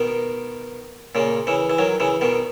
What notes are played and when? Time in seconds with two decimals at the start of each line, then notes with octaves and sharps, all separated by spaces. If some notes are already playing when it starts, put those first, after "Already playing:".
Already playing: B2 D#3
1.15 A#2 C#3
1.47 C#3 E3
1.70 E3
1.79 D#3 F#3
2.00 C#3 E3
2.21 B2 D#3